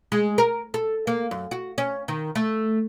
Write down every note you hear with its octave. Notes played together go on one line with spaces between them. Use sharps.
G#3
A#4
A4
A#3
F#2
F#4
C#4
D#3
A3